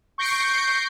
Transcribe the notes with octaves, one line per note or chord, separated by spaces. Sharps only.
C#6 G6 A#6 C7 D7